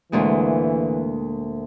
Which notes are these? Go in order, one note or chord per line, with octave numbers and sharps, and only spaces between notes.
D2 A#2 E3 G#3